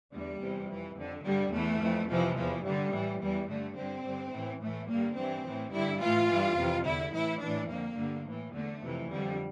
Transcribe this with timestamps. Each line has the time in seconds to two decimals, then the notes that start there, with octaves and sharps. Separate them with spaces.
0.11 E2 D3 G3
0.40 E2 C3 E3
0.68 F2 E3
0.96 F2 D3
1.24 G2 D3 G3
1.52 E2 E3 A3
1.80 F2 E3
2.08 F2 C3 E3 F3
2.36 E2 E3 F3
2.64 G2 D3 G3
2.93 A2 E3
3.21 E2 E3 G3
3.48 G2 D3 A3
3.76 G2 D3 C4
4.05 G2 D3
4.32 A2 E3
4.61 A2 E3 A3
4.88 G2 D3 A#3
5.17 G2 E3 C4
5.45 A2 E3
5.73 G2 D3 E4
6.00 A2 E3 F4
6.29 G2 E3
6.57 F2 C3 E3
6.85 E2 D3 E4
7.13 A2 E3 E4
7.41 A2 E3 D4
7.69 F2 D3 A#3
7.97 G2 D3
8.25 A2 E3
8.53 E2 D3 A3
8.82 F2 C3 E3
9.09 F2 D3 G3